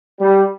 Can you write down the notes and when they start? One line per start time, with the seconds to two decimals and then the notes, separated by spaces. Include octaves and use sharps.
0.20 G3